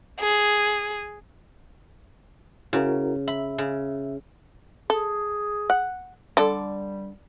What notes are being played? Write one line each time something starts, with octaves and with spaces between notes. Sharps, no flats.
G#4
C#3 E4 F#4 A#4
E5 B5
C#3
G#4 A4
F#5
D3 G3 A4 D5